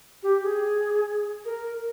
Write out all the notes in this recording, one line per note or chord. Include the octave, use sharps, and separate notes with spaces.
G4
G#4
A#4